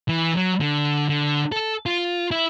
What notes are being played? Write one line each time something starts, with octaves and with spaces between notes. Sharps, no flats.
E3
F#3
D3
D3
A4
F4
E4